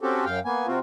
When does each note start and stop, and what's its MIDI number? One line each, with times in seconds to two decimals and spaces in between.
0.01 0.25 60
0.01 0.25 61
0.01 0.25 66
0.01 0.25 67
0.01 0.25 69
0.25 0.40 42
0.25 0.40 77
0.25 0.40 79
0.45 0.67 58
0.45 0.67 59
0.45 0.67 80
0.67 0.79 48
0.67 0.79 60
0.67 0.79 65
0.67 0.79 66